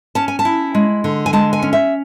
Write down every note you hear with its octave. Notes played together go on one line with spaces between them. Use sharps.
C#4 A5
G#5
A5
E4
G#3
D3
G#5
G#3 A5
G#5
C#4
E5